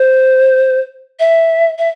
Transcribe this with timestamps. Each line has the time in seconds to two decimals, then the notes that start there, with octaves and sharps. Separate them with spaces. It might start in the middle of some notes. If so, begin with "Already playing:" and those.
Already playing: C5
1.19 E5
1.78 E5